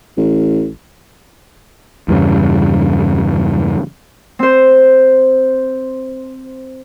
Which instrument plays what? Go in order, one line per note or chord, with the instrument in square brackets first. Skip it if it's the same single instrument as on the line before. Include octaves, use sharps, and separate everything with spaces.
[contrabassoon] A1
[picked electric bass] E2 G2 C#3
[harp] C4 C5